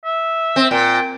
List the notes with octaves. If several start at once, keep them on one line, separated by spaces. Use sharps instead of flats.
E5
C4
A#2 G5